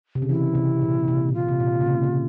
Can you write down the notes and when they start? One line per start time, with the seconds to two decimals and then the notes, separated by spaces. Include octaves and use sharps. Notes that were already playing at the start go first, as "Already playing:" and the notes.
0.15 C3
0.22 C#3
0.29 E3 E4
0.55 C3
0.82 A#2
1.08 C3
1.29 A#2
1.34 C3 F4
1.49 C3
1.60 A#2
1.81 C#3
1.86 C3
2.04 C#3